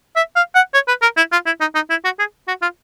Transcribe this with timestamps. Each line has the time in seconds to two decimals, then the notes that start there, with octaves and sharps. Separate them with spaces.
0.16 E5
0.36 F5
0.55 F#5
0.74 C#5
0.88 B4
1.02 A#4
1.17 E4
1.32 F4
1.46 E4
1.61 D#4
1.75 D#4
1.90 E4
2.04 F#4
2.19 G#4
2.48 F#4
2.62 F4